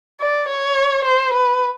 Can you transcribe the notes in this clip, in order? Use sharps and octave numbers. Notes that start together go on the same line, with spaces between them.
D5
C#5
C5
B4